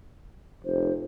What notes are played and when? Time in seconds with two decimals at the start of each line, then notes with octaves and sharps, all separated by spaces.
0.65 F1 C5